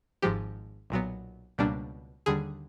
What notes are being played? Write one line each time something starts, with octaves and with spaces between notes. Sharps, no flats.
G#1 G#2 F3 G#3 G4
B1 A#2 F#3 B3
C#2 B2 G3 A#3 D4
D#2 D3 G3 G#4